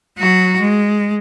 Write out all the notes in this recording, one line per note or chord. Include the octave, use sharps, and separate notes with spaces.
F#3 F#4
G#3